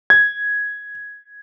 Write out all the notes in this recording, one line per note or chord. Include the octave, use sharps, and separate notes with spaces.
G#6